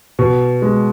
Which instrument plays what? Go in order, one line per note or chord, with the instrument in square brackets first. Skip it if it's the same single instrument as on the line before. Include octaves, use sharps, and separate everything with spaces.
[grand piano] B2
G#3